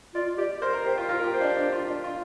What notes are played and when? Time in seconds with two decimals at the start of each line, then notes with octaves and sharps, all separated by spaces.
0.15 F4 D5
0.38 G4 D5
0.62 A#4 C5
0.73 A#4
0.85 G4 C5
0.98 F4
1.08 F4 A#4
1.19 A#4
1.24 G4
1.33 C5
1.41 D4
1.57 D4
1.73 F4
1.87 D4
2.04 F4